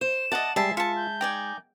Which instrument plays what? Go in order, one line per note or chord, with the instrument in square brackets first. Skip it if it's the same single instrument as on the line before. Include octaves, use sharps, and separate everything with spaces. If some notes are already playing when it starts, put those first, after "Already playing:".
[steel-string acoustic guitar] C5 [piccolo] E7
[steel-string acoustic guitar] D5 F#5 [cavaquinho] D#5 A5
[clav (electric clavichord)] G3 [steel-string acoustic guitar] G#3 [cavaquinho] E5 A5 [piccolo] C7
[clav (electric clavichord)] F4 [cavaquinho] E5 A5 [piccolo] C#7
[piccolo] G6
[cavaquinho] D#4 D5 G#5 [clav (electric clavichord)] G5